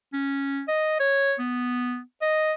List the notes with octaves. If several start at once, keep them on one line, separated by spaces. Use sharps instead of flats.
C#4
D#5
C#5
B3
D#5